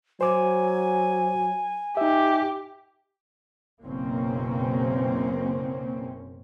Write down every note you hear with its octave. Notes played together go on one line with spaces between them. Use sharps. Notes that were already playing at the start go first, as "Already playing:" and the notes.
F#3 C5 G#5 D6
D#4 G4 E5
F#1 F#2 B2 A#3 C4 C#4